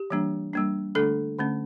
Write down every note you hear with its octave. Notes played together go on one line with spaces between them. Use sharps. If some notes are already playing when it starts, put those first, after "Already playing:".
Already playing: G4
E3 G3 A#3 D4
G3 A#3 D4
D3 A3 D4 A4
D3 A3 C#4